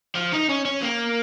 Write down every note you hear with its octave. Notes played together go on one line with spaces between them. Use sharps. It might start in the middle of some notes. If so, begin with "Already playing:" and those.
F3
D#4
C#4
C#4
A#3